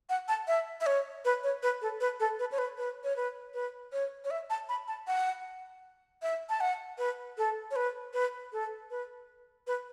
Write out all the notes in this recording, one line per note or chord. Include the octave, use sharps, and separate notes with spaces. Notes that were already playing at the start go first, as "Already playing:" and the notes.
F#5
A5
E5
E5
C#5
B4
C#5
B4
A4
B4
A4
B4
C#5
B4
B4
C#5
B4
B4
C#5
C#5
E5
A5
B5
A5
F#5
E5
A5
F#5
B4
A4
C#5
B4
B4
A4
B4
B4